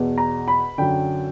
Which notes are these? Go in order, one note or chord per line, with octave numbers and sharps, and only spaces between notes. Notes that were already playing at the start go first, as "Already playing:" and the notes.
Already playing: E2 B2
A#5
B5
F#2 D3 G5